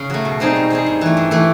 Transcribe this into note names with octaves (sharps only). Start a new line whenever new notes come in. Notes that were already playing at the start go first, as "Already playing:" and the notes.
Already playing: C#3
F#3 A3
B2
G3 C4 D#4 G#4
B2
G3 C4 D#4 G#4
G2
E3 A3
G2
E3 A3